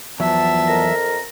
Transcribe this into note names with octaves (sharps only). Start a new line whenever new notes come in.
E2 F3 F#3 B3 E5 A5
F2 A#4 A#5